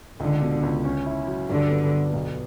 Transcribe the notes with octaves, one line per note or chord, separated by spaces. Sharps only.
C#2 D3
B2
C#2
C#4
E4
F#3
G2 D3
B3
B3
B1